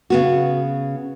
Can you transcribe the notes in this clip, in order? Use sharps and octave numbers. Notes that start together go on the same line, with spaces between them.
C#3 B3 F#4